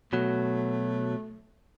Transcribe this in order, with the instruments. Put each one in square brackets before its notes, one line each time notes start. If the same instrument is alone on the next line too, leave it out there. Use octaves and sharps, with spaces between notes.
[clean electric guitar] B2 F#3 [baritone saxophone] A3